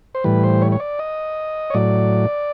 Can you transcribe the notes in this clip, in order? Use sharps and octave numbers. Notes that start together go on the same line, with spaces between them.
C5
A2 E3 G3 B4
C5
C#5
C#5
D5
D#5
C#5
A2 F#3 D5